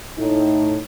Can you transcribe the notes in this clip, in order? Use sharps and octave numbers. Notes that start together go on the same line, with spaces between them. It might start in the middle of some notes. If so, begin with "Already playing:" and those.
A2 D#4